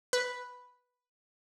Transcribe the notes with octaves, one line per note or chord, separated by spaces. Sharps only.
B4